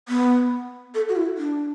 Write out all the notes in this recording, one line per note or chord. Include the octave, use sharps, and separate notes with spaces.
B3
A4
F#4
E4
D4